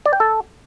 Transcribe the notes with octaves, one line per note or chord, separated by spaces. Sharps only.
D5
G5
A4